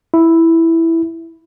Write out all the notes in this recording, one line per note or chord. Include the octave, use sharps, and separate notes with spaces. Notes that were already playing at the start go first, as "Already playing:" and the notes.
E4